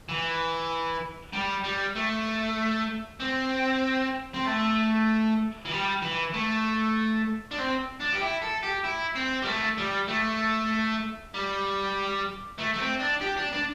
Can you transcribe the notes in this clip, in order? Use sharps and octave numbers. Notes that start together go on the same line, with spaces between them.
E3
G3
G3
A3
C4
C4
A3
E3
G3
E3
A3
D4
C4
D4
G4
E4
A4
G4
E4
C4
G3
A3
G3
A3
G3
A3
A3
C4
D4
G4
D4
D4